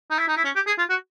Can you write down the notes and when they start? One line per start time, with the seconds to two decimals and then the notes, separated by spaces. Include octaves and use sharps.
0.10 D#4
0.19 E4
0.28 D#4
0.36 E4
0.44 C#4
0.55 G4
0.67 G#4
0.78 F4
0.89 F#4